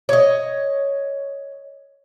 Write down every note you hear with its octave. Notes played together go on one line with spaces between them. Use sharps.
C#5 D#5